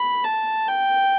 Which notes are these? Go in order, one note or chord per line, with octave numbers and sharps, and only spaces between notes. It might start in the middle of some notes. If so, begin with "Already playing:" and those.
Already playing: B5
A5
G5